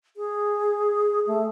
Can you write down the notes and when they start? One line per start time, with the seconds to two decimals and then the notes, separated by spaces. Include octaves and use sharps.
0.17 G#4
1.27 A3